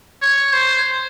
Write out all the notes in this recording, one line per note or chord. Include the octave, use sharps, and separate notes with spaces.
C#5
C5